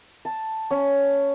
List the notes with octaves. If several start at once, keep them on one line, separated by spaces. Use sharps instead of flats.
A5
C#4